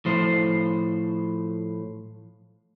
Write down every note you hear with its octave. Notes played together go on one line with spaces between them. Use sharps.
A2 F3 C5